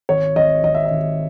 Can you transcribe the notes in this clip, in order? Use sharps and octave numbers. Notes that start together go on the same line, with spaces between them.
G#1 C#5
G#1 D#5
G#1 D#5
E5
D#5
G#1